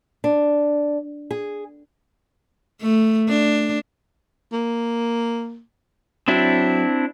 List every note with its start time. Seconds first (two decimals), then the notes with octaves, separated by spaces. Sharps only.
0.24 D4
1.31 G#4
2.81 A3
3.29 D4
4.53 A#3
6.28 F#3 C4 D4 E4